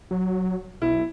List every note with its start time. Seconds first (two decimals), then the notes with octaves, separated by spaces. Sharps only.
0.11 D#1 F#3
0.82 B1 E4